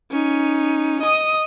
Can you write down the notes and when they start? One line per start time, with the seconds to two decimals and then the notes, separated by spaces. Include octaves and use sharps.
0.11 C#4 D#4
1.02 D#5 D#6